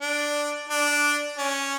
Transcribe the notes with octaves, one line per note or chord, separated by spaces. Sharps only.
D4
D4
C#4